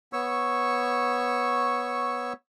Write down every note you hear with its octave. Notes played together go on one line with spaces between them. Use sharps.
B3 C#5 C#6 E6